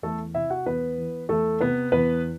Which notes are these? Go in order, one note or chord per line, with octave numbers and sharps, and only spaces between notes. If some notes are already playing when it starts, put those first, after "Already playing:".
E2 A3 A4
C3 E4 E5
F#4 F#5
E2 B3 B4
E3
E2 A3 A4
C3 B3 B4
E2 B3 B4